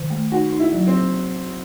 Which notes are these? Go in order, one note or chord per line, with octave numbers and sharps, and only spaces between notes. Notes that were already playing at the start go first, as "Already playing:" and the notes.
Already playing: D#3
A3
D#4 F#4
D#4
E4
F#3
C4